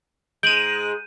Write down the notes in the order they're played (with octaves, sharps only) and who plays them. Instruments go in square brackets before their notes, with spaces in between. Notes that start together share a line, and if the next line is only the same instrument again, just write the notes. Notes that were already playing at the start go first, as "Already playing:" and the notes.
[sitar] G#2 G#3 [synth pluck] G6 D#7 [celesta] D7 F#7